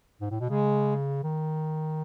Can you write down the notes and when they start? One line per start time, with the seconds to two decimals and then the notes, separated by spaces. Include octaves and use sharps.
0.21 G#2
0.31 A2
0.40 B2
0.50 C#3 G#3
1.24 D#3